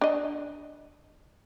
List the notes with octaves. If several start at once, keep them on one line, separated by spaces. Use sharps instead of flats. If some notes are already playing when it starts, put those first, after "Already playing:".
D4 D#5